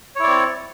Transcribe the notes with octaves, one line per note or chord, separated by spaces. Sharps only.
C4 E4 C#5 D5